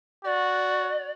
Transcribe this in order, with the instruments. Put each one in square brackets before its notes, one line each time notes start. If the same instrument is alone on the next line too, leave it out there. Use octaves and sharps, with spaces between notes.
[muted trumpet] F#4 [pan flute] D5